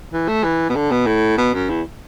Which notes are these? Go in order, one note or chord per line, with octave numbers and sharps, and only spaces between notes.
E3
A3
E3
B2
D3
B2
A2
B2
F#2
E2